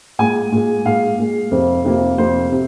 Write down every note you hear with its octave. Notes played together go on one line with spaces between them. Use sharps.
A#2 G#3 G#5
A#2 G#3
A#2 G#3 F5
A#2 G#3
F2 C3 F3 A#3
F2 C3 F3 A#3
F2 C3 F3 A#3 C5
C3